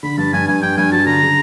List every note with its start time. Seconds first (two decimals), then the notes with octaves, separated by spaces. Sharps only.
0.03 D3 B5
0.18 G2 A5
0.33 G2 G#5
0.48 G2 G#5
0.62 G2 G5
0.77 G2 G#5
0.92 F#3 A5
1.06 D3 A#5
1.22 C#3